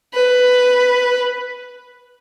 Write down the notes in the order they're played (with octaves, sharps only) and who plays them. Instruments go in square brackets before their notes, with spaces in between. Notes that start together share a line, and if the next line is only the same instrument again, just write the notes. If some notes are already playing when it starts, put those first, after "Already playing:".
[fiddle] B4